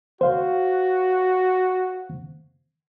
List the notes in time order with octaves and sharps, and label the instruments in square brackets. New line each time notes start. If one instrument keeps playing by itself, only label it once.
[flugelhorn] F#4 [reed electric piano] C5 F5